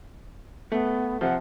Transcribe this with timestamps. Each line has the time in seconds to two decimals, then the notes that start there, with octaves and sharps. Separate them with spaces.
0.72 A3 B3
1.21 C3 F3 F#5